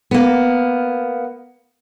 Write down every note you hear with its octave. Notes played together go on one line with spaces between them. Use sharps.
A#3 B3